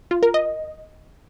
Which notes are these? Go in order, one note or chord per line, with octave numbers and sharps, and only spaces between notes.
F4
A#4
D#5